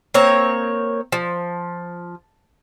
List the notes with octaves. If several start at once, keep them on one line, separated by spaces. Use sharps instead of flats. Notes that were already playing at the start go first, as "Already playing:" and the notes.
A#3 C4 C#5 A#5
F3